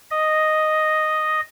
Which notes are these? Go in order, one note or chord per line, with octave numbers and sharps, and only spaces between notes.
D#5